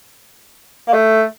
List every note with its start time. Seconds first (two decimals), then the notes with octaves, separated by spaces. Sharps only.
0.88 A#3
0.93 A3